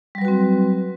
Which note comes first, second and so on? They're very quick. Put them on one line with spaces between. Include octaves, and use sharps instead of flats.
G3 F#3 B4 F#4 C4